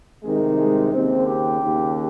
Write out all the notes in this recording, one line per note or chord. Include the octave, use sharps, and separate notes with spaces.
C2 C3 D#3 G#3
G#3
D#2 C#3 C4
G4
D#2 C#3